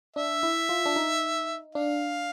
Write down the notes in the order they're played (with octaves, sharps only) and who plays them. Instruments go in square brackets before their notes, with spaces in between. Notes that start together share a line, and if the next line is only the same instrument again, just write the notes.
[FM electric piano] D4 [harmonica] E5
[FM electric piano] E4
F4
D4
D#4
[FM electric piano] D4 [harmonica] F5